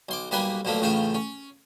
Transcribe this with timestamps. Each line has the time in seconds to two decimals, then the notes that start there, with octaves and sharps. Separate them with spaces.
0.09 B1 C6 D6
0.31 B1 G3 A#3 B4 G#5 C6
0.65 B1 A#2 F3 A3 A#3
0.82 A1 A2 C#3 F4 C5
1.14 C#4